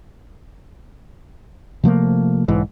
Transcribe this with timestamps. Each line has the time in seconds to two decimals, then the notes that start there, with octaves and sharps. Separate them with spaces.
1.84 C3 F3 A3 A#3
2.48 B1 G#2 E3